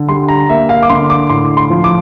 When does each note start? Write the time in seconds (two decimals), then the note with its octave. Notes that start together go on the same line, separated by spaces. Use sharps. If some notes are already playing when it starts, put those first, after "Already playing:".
Already playing: D3
0.08 G3 C6
0.28 A#5
0.49 A#3 E5
0.69 F5
0.83 D6
0.90 D3 C6
1.10 D6
1.29 A2 C6
1.57 C6
1.70 F3
1.84 D6